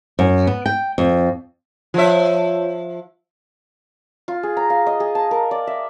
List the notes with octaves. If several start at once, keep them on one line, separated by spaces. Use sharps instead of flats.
F#2
B3
G5
F2
F3 F4 C#5 E5
F4
G#4
A#5
F5
D#5
G#4
A5
A#4
D5
E5